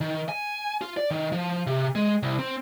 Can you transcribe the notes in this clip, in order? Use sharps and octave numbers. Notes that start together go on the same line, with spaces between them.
D#3
G#5
F4
D5
D#3
F3
C3
G#3
C2
C4